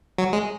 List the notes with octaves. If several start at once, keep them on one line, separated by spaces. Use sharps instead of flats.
F#3
G#3